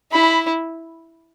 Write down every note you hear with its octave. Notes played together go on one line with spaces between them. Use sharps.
E4 B5